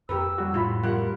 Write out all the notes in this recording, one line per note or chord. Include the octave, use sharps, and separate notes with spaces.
F2 G4 A#4 B4 E6
G3 F#4
A2 E4 F4 B5
G3 F4 A#4 F#5